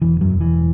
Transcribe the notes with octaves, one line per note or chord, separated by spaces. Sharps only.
E1 E3
F#2 F#3
E1
E3